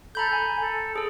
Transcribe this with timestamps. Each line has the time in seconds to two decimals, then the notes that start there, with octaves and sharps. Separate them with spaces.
0.15 A4 A#5 B5 G6
0.31 G#5
0.61 A4
0.96 G#4 A4